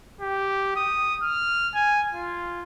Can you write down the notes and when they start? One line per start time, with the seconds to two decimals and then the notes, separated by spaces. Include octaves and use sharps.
0.21 G4
0.76 D#6
1.23 F6
1.75 G#5
2.13 F4